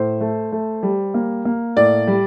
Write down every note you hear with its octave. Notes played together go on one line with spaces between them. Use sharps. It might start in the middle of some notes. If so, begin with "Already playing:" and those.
Already playing: A2 C5
A3
A3
G3
A#3
A#3
A2 D5
G3